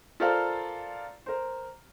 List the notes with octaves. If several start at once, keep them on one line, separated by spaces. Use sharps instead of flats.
F4 A4 A#4 C5 D5 F5
A#4 C5